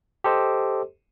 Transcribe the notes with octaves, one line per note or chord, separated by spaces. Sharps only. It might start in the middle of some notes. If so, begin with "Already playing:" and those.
G4 A4 C5 D#5